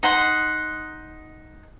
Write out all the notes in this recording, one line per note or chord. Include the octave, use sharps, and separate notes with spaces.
D#4 F#5 C6